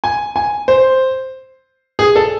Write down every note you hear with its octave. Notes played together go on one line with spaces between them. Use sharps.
G#5
G#5
C5
G#4
A4